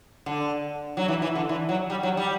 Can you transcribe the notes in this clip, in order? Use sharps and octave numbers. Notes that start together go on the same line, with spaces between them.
D3
F#3
E3
E3
D3
E3
F#3
G3
F#3
G3